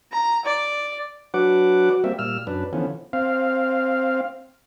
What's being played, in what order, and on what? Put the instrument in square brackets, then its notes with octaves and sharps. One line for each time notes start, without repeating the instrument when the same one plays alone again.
[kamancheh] A#5
D5
[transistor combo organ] F#3 D4 F#4 B4 F#5 D6
F#4
G3 A#3 C4 E5
A#2 G3 E6 F6
F#2 D4 B4
D3 E3 F3 B3 C#4
C4 F5